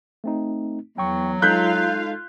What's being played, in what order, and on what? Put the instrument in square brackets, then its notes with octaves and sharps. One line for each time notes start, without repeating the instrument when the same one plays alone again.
[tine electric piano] A3 C4 D#4
[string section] E2 [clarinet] F#3 [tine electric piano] G5 C#6
[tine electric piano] G#3 D#4 A4 [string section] F4 F5 [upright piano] F#6 G6 B6